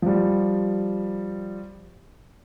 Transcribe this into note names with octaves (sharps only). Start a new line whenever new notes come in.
F3 G3